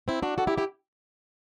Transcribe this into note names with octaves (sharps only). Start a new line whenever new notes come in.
C4 E4
D4 F#4
F#4 A4
E4 G4
E4 G4